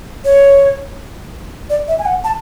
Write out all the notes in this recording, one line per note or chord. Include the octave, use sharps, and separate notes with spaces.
C#5
D5
E5
G#5
F#5
A5